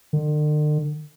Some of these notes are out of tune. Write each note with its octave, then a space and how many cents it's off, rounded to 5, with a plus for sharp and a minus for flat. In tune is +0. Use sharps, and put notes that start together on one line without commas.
D3 +45